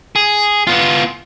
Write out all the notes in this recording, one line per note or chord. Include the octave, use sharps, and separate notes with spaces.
G#4
B3 F4